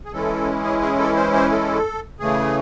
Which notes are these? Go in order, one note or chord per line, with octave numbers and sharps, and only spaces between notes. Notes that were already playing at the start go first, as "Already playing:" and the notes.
G#4
E3 G#3 C#4 E4 A4
G#4
G#4
A4
C5
C5
A4
C#3 E3 A3 G#4